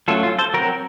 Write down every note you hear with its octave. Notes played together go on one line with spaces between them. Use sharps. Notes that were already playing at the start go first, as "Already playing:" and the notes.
F#3 A3 C#4 F4 A4
F4
A4 C5
F#3 C4 F#4 A#4